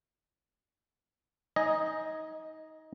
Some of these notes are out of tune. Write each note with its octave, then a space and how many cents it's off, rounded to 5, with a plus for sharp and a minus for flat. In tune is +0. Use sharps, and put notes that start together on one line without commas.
D#4 +20 D#5 +0 G#5 +0